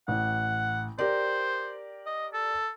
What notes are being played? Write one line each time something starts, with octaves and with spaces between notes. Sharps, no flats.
A1 F#5
G4 A#4 C5 D5
D#5
A4